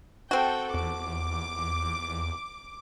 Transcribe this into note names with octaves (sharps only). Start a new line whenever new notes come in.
C4 F#4 A4 G5
E2 D6